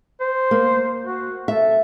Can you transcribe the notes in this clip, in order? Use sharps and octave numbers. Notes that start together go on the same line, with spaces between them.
C5
A#3
F#4
A4 E5